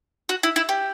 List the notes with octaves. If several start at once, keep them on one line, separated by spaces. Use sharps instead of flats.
F#4
E4
E4
G4